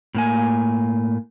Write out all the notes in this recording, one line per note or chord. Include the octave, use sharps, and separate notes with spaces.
A2 A#3 G#5